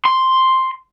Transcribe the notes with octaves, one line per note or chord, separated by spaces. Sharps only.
C6